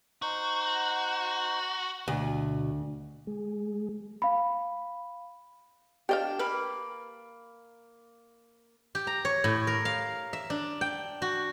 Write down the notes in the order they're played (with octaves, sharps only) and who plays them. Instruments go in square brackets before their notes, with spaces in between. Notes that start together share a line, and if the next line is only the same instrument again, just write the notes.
[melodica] D#4 C5 [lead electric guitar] F#4
[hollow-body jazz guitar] D2 [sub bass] B2
[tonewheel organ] G#3
[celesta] F5 B5
[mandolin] D4 G5 [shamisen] G4 D#5 F5
[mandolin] A#3 B5 F6 [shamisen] B4
[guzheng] G4
A#5
C#5
A2
A#4
F5
E5
D4
G5
F#4